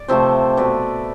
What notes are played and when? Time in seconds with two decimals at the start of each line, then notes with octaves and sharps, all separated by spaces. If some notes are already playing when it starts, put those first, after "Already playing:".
Already playing: D5
0.08 C3 F3 A3 C5 E5
0.57 B2 A3 B4 D5